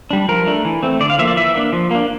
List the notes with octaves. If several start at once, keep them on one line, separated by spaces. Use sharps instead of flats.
G3 D4
F3 A#4
A3 D4
E3
A3 C4
D3 D5
F5
F3 A#3 E5
D5
E3 E5
A#3 D4
F3
A#3 D4